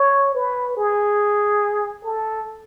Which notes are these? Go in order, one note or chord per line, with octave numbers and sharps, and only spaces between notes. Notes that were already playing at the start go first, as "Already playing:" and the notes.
Already playing: C#5
B4
G#4
A4